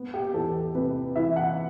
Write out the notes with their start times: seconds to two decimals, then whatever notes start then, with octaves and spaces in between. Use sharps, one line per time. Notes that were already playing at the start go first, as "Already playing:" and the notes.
Already playing: B3
0.14 G4
0.34 E2 A4
0.75 C3 B4
1.16 E3 E5
1.36 F#5